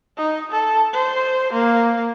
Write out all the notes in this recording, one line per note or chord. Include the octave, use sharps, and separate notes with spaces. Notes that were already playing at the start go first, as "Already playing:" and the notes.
D#4
A4
C5
A#3